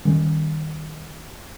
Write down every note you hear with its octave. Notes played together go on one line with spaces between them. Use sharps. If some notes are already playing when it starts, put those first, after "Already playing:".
D#3 G3 C#4